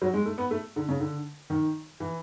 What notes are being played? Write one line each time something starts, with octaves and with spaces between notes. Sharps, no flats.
F#3
G#3
A3
B3
A3
D3
C#3
D3
D#3
E3